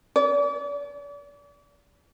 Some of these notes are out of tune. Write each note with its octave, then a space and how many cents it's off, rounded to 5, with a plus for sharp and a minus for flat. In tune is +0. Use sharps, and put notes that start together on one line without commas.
D5 -40